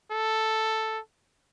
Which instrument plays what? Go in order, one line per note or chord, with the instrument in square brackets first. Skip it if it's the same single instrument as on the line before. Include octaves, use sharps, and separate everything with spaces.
[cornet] A4